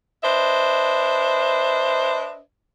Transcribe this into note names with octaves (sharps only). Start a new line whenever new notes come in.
D4 B4 C5 D#5 E5